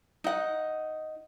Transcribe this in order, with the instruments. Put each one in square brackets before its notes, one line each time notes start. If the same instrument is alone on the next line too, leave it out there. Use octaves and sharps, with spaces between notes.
[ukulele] D#4 F#5